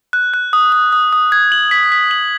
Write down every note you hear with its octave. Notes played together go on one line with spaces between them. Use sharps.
F#6
F#6
D#6
D#6
D#6
D#6
G#6
F#7
B6
B6
F#7